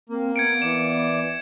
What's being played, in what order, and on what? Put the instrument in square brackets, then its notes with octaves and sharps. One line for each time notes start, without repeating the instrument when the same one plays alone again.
[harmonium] A#3 [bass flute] C4
[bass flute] B3 [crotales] G#6 C#7 D7
[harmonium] E3 D5 [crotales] E7